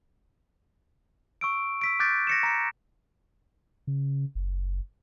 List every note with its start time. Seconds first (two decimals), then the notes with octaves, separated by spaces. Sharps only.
1.41 C#6 E6 D7
1.81 E6 B6 D7
2.00 D6 F#6 G6 A6 B6 D7
2.27 A#6 C#7 E7
2.43 A#5 C#7
3.87 C#3
4.35 F#1